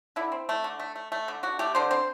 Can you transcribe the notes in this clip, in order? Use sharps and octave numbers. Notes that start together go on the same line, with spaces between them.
D3 E4
C4
A3
D3
A3
A3
A3
D3
D3 F#4
A3 G4
D3 C5
C4 C5